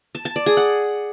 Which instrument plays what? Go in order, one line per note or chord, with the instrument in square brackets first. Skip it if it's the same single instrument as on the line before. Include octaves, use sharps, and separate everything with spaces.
[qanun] A5
A5
D5
G#4
F#5